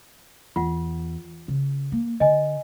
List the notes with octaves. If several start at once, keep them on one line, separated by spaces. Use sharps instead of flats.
E2 F4 F#5
C#3
A#3
D3 D#5 G#5